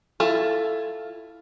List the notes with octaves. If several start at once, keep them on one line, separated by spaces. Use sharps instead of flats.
E4 F4 A4